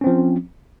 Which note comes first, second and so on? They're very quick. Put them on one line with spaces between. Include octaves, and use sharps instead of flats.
C#4 C4 F3